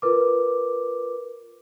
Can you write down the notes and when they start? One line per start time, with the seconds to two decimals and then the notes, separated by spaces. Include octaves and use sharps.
0.02 F4 A#4 B4 D6